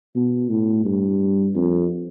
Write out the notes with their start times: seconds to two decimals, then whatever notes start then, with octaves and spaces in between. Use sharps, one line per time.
0.15 B2
0.50 A2
0.85 G2
1.55 F2